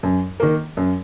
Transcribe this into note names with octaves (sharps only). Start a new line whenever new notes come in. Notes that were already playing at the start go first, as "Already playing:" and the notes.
F#2
D#3 A#3
F#2